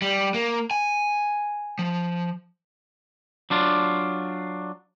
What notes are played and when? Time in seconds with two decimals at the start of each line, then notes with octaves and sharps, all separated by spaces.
0.02 G3
0.34 A#3
0.71 G#5
1.79 F3
3.50 F#3 D4 F4